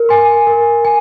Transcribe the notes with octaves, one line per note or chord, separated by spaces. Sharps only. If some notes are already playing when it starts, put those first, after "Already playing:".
Already playing: A#4
G#5 C6
A#4
G#5